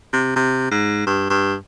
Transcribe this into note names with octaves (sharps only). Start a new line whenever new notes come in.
C3
C3
G#2
G2
G2